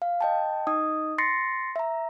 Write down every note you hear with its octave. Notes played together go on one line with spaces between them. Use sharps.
F5
D#5 G5 A5
D#4 D#5 D#6
C6 A6 A#6 C7 C#7
E5 A#5